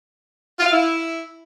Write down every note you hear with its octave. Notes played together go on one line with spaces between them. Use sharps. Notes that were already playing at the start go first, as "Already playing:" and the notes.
F4
F5
E4